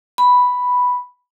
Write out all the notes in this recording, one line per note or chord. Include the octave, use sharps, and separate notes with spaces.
B5